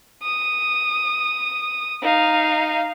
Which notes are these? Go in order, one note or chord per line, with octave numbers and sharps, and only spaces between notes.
D#6
D#4 F5